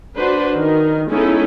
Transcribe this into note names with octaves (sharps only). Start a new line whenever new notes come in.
D4 F#4 B4 C5
D#3 A#4
G#3 B3 C#4 D#4 E4 A4